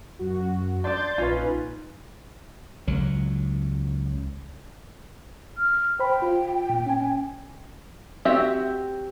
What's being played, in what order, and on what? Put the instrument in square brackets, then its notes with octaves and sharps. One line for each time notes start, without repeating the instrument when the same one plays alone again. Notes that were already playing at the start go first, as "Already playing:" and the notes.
[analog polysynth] F#2 F#4
[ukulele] D4 D5 [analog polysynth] C6 G6 A6
[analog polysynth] A#1 D#4 B4 [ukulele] C#4 F4
[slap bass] C#2 F#3
[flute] F6
[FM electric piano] C5 B5 [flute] G5
[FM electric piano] F4
A#2
C#4 G#5
[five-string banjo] C4 F#4 G4 E5